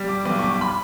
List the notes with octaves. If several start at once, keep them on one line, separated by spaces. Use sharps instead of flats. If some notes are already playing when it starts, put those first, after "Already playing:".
Already playing: G3
D6
B1 D6
C#6
D6
B5